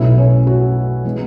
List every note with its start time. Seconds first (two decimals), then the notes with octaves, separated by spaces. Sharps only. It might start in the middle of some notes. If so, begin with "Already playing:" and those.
Already playing: B1 B2 A3 C#4 E4
0.18 C#4
0.47 F#4
1.05 E3 G#3 B3